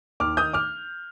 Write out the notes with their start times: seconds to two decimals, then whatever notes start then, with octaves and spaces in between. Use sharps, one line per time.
0.20 D#2 D6 F6
0.37 D#3 D#6 G6
0.53 D6 F6